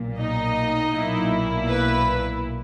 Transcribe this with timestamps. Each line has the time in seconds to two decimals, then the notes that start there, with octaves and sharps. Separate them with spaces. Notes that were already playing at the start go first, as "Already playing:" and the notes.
Already playing: B1 A#2 A#3
0.18 D#4 D#5
0.93 B1 A#2 A#3 E4
1.69 B4